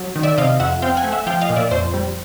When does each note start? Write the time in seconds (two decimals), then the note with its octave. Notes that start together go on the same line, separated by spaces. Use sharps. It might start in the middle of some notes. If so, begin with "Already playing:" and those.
Already playing: F#3
0.16 D#3
0.23 D5 E5
0.38 C3 D#5 F5
0.60 F2 E5 F#5
0.82 C4 F5 G5
0.97 F#5 G#5
1.04 A3
1.12 E5 F#5
1.27 F3 F5 G5
1.41 D#5 F5
1.50 A#2
1.56 D5 E5
1.71 F2 C5
1.94 G3